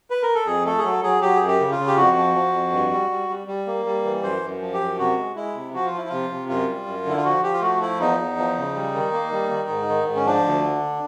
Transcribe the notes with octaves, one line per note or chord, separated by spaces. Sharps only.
B4
A#4
A4
F2 G#4
A3 A4
G#4
F#3 A4
F#3 G#4
F#3 G4
F#2 G#4
G4
C#3
F4
C#3
G4
F2 F#4
F3
F3
F2
G2
G3
G3
G3
G3
A#3
G3
E3
F#2 C5
F#2
F3
G4
F#2
C3 F#4
G#3
G#3 E4
C3
F3 F#4
F4
F3 E4
C3 F4
C3
F#2 F4
G3
F#2
D3 E4
F4
F3 F#4
F3 G4
F4
A3 F#4
F3 E4
E2 D#4
E2
F3
C#3
G3
D#3
A#3
G3
D#3
G#2
D#3
G#2
C#4
F3 D4
D2
D3